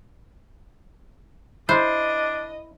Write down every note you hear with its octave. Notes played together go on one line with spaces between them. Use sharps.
D4 E4 C5 D#5